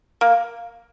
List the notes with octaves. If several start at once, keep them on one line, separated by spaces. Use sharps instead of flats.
A#3